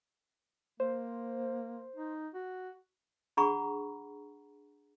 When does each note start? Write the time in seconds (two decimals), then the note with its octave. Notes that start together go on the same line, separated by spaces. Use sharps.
0.80 A#3 C5
1.96 D#4
2.34 F#4
3.37 D4 G#4 F#5 A#5 B5 C#6